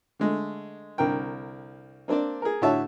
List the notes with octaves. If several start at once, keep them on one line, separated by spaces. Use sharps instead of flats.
D3 G#3 A3
C2 D3 A#4 G5
A#3 C4 D4 C5 D5
G#4 A#4
A2 D3 F#4 C#5 E5 A5